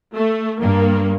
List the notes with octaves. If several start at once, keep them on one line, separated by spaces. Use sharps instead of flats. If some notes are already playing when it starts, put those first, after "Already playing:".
A3
G2 A#3